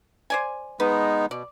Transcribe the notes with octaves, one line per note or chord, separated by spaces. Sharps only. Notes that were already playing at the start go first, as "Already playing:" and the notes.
C5 D5 G#5
G#3 B3 D#4 B4
B2 D5